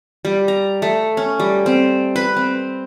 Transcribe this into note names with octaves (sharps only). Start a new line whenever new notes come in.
G3
A#5
A3
C#4
G3
C4
B4
C4